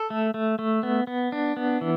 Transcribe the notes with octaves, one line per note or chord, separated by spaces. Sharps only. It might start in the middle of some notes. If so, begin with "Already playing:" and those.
Already playing: A4
A3
A3
A3
B3
B3
D4
B3
E3